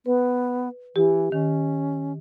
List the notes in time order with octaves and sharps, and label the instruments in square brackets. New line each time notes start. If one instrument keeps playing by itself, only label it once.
[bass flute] B3 [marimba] B4
[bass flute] E3 [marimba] G4
[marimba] D#3 [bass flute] C#4